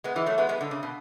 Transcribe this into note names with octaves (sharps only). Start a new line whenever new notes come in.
G#3 B3
E3 G#3
F#3 A3
G#3 B3
G#3 B3
D3
C#3
B2